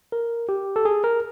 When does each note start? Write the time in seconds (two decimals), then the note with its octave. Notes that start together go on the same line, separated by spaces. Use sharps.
0.12 A#4
0.49 G4
0.76 A4
0.85 G#4
1.04 A#4